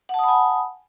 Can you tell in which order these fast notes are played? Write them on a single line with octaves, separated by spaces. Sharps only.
F#5 A5 D#6 B5 G#5